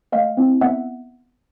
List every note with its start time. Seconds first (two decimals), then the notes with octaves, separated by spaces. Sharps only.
0.12 A3 D#5 F5
0.37 C4 E4
0.61 B3 E5 F#5